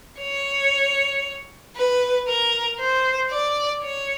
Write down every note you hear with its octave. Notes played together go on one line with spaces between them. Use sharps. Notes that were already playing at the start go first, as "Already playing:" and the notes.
C#5
B4
A#4
C5
D5
C#5